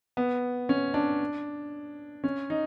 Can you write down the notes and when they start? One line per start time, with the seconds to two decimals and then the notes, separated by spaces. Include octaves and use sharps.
0.17 B3
0.69 C#4
0.94 D4
2.24 C#4
2.50 D#4